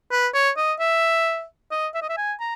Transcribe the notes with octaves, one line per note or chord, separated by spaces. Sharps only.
B4
C#5
D#5
E5
D#5
E5
D#5
E5
G#5
A#5